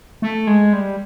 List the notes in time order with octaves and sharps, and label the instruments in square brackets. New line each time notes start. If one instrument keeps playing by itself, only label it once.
[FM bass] A3
G#3
G3